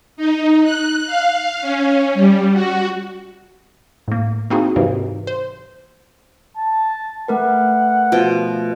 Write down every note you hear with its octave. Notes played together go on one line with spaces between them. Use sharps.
D#4
F#6
F5
C#4
G3
F#4
A2 A#3
A#3 C4 D#4 E4 F#4 G#4
G#2 C3 E3 F#3 A#3 D#4
C5
A5
A3 A#4 B4 F#5
B2 F3 G5